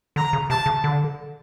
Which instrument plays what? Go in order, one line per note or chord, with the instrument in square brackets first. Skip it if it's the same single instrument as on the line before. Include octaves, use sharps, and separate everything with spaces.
[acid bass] D3 [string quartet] A#5
[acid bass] C#3
[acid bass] C3 [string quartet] A5
[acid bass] C#3
D3